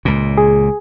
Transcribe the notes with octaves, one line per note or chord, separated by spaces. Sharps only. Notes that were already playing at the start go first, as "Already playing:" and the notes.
C#2 A#2
G#4